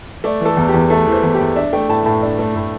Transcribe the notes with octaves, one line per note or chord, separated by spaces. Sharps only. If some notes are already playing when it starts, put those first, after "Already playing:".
A3 D5
E3 A4
E2
G4
E2
A3 A4
E3
C5
E2
G4
E2
D4 E5
A3 G5
A2 A5
A2 A5
D4
A3
A2